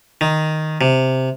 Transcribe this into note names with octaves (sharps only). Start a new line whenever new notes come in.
D#3
C3